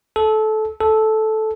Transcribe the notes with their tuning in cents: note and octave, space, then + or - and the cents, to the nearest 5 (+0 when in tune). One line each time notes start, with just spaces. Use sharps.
A4 -20
A4 -10